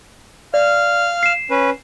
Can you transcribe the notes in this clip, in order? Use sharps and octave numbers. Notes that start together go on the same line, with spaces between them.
D5 F5 F6
C7 E7
C#4 B4